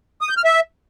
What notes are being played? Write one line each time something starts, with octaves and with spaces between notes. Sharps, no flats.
D#6
G6
F6
E5